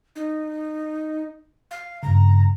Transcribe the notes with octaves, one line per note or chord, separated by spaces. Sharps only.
D#4
F5
G2 C#3 A#5